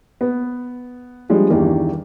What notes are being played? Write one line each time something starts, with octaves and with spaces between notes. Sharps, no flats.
B3
F3 G3 G#3 D4
E2 G2 D#3 E3 G3